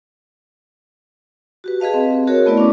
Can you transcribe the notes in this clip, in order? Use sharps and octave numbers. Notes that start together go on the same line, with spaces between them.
F#4 G4 B4
G#4 B4 D#5 F5 A5
C4
F#4 G#4 A#4 C#5
A3 B3 E4 B4 D5
C#4 D6